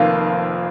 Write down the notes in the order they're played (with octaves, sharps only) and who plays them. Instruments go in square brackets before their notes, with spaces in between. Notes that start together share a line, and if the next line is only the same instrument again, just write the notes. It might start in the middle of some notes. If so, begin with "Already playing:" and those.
Already playing: [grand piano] F1 F2 D#3 A#3 F4 [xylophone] F5